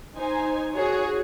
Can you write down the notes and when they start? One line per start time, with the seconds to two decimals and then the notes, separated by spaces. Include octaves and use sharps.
0.17 D#4 C5 G#5
0.74 F#4 G#4 C#5